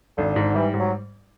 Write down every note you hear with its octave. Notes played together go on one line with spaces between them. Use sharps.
G#1 D3
G#2
E3 G3
G#2
F#3